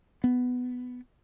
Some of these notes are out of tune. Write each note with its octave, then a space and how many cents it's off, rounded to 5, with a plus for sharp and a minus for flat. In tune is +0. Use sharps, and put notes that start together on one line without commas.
B3 +10